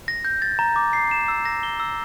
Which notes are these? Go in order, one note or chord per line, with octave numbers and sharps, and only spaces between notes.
A#6
G6
A6
A#5
D6
C7
E7
E6
A#6
G7
E6